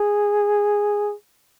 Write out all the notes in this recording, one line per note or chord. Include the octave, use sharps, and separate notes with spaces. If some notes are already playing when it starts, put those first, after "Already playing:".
Already playing: G#4